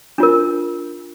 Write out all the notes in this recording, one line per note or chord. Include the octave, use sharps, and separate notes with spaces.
D4 F4 A#4